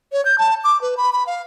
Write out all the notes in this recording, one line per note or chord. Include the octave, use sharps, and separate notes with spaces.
C#5
G6
A5
D6
B4
B5
B5
F5